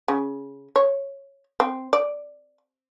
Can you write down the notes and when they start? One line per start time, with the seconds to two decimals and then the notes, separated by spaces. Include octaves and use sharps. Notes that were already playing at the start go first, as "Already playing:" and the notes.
0.08 C#3
0.76 C#5
1.60 C4
1.93 D5